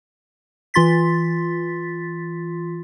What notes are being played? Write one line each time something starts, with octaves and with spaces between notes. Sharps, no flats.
E3 F4 C6 A6 B6